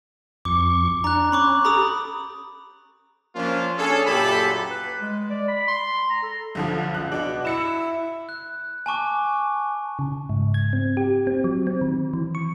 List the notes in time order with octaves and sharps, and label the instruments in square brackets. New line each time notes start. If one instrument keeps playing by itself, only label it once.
[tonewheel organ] F2 C#6 [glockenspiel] D6
[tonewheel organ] D4 [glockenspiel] A#5 F#6
[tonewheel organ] C#4 [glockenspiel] B5 C#6 D6
[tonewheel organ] G4 A4 [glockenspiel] A#5 B5 D#6
[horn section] F3 A#3 C#4 D4 F4
C#4 D4 G#4 A4
F#2 A#2 G4 A4 B5
[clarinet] B4
G#3
D5
B5
C6
A#5
A4
[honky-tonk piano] B1 D3 F3
[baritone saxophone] C#2 [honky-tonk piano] F#6
[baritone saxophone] B2 [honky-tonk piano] D4
[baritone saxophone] E4 [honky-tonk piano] E6 C#7 E7
[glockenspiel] F#6
G#5 A5 C#6 D6
[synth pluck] C#3
G#2
G#6
C4
G4
C4
F#3
C4
D#3
E3
C#6